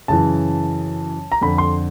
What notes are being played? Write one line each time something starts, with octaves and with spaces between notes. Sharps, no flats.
F#2 C#3 E3 A5
A#5
F2 D3 B5
C6